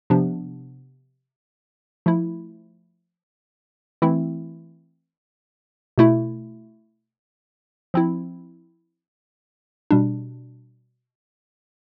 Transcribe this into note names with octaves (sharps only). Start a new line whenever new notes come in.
C3 F3 B3 D4
F3 A3 E4
E3 A3 C4 E4
B2 A3 E4
F3 C4 E4
B2 G3 D4